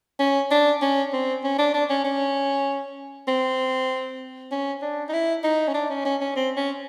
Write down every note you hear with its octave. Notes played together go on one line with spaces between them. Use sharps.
C#4
D4
C#4
C4
C#4
D4
D4
C#4
C#4
C4
C#4
D4
D#4
E4
D#4
C#4
D4
C#4
C#4
C#4
C4
C#4